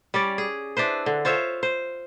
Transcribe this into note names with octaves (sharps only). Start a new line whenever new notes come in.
G3 C#4 D5
G#4
D4 E4 B4 C5
D3
F4 C5 C#5 E5
C5